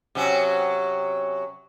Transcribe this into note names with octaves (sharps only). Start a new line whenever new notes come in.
C3 F#3 C#4